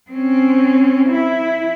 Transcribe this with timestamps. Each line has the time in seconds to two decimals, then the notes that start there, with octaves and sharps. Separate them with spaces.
0.11 C4 C#4
1.09 E4